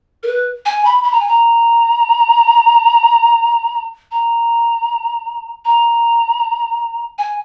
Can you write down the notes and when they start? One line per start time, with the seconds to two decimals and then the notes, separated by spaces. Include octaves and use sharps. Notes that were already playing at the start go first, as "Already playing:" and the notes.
0.23 A#4
0.27 B4
0.66 G#5
0.85 B5
1.03 B5
1.12 A#5
1.20 G#5
1.28 A#5
4.11 A#5
5.65 A#5
7.18 G#5